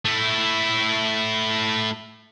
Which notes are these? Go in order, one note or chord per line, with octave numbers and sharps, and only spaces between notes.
A3 E4